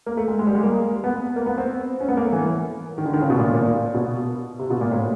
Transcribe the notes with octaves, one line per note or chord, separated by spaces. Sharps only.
A#3
A3
G#3
G#3
G3
G#3
A#3
B3
A#3
B3
C4
C#4
B3
A#3
A3
E3
D#3
D3
D#3
C#3
B2
A#2
A2
A#2
B2
C3
B2
A#2
A2